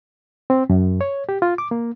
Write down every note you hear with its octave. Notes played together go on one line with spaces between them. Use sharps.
C4
F#2
C#5
G4
F4
D6
A#3